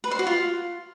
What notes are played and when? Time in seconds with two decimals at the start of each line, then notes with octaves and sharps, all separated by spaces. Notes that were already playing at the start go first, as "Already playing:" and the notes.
0.04 B4
0.11 C5
0.19 F#4
0.27 F4